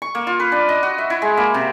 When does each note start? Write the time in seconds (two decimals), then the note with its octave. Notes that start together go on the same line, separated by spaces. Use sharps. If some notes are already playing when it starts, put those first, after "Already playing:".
0.02 C#6
0.15 A#3
0.27 F4
0.40 B4
0.52 D4
0.69 D#5
0.83 F#4
0.98 E5
1.10 E4
1.22 G#3
1.37 A#3
1.54 C3